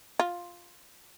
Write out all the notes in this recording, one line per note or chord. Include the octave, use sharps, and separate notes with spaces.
F4